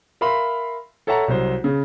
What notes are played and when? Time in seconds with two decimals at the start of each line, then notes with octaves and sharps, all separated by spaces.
0.21 A#4 E5 F5 B5 C6
1.07 A4 C#5 E5 F#5 A5 A#5
1.28 C2 F#3 C5
1.64 C#3